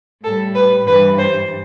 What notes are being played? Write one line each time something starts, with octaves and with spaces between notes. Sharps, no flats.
A2 G3 A4
B4
G2 E3 G3 B4
C5